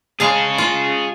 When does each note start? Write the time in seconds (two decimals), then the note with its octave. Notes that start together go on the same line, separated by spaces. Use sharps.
0.20 G#3 G#4 C#5 F5 A5
0.58 F4